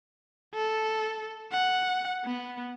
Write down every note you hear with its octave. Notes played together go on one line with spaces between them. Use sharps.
A4
F#5
B3